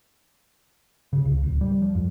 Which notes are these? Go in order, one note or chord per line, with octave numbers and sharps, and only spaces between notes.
C#3
C#2
D1
G3
F3
F2